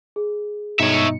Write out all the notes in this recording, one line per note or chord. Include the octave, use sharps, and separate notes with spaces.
G#4
G2 B2 D#4 C#5 E5 C#7